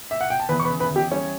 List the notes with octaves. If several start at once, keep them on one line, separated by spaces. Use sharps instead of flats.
E5
F#5
G5
A5
E2 B4 B5
C#6
B4 B5
C#3
B4 B5
E2
G4 G5
G3 C#4 C#5